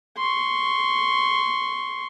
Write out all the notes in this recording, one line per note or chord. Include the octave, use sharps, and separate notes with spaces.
C6 C#6